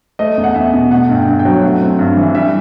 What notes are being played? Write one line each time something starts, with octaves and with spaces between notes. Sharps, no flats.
A3 D#5
E2
F#5
E2 E5
B2
A3 F#5
G2
G5
G2
G5
F#3
A3 F#5
C4
G2
E3
G3 E5